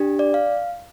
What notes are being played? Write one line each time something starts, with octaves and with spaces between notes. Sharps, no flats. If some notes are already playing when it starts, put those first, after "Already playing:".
Already playing: D4 G4
D5
F5